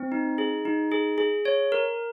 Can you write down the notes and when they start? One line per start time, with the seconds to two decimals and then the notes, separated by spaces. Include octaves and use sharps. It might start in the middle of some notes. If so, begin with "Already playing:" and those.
Already playing: C4
0.12 D#4
0.38 G#4
0.65 D#4
0.91 G#4
1.18 G#4
1.45 C#5
1.72 A#4